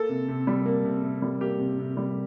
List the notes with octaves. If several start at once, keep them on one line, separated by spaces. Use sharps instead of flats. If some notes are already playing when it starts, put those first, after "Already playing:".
Already playing: A#3 A4
C3
C3
G3
A#3
C3
C3
G3
A#3 G4
C3
C3
G3